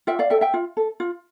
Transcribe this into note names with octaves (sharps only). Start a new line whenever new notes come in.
F4 E5 G5
D5 F5
A4 E5 G5
E5 G5
F4
A4
F4